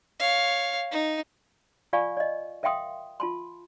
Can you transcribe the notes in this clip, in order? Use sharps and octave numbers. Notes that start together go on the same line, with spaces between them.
C#5 F5
D#4
F4 D5 F5 G#5 C#6
D5 D#5
A#4 E5 F5 G5 C6 D#6
F4 A5 C6